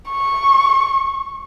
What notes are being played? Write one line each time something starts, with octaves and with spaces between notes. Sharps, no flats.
C#6